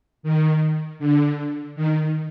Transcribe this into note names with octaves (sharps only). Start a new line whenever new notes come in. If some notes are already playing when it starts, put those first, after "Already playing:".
D#3
D3
D#3